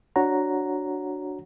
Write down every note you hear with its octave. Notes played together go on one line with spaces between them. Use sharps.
D4 F#4 C#5 F#5 A#5